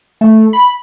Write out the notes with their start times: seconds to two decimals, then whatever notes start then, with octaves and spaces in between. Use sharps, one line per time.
0.21 A3
0.53 B5